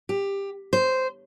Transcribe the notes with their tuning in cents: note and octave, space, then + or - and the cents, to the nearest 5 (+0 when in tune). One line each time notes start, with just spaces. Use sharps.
G4 +15
C5 -10